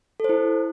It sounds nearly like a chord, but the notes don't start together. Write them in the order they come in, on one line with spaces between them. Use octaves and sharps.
A4 C5 E4